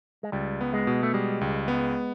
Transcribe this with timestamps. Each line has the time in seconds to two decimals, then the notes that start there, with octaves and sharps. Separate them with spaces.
0.23 G#3
0.32 C#2 G3
0.61 B3
0.73 G#3
0.87 B2
1.03 A3
1.14 G3 G#3
1.41 C#2
1.68 B3